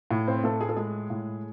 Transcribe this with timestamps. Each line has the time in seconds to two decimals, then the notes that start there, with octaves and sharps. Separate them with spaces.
0.11 A2
0.27 C4 C5
0.44 A2 A3 A4
0.61 G#4
0.69 A4
0.77 G#3 G#4
1.10 A2